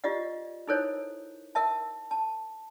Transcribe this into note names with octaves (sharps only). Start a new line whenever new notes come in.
F4 G4 D5 D#5 F#5
D#4 E4 A4 A#4 C5 C#5
A#4 E5 A5
A5